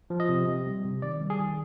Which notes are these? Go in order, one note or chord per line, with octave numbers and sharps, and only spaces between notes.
F3
D#5
C3
C3
G3
C3
D#3 D5
G3
G#4
D#3